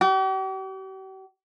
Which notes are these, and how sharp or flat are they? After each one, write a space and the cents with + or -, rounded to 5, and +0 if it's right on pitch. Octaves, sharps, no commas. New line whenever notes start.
G4 -45